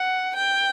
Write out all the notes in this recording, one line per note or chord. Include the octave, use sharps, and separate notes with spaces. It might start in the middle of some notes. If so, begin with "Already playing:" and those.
Already playing: F#5
G5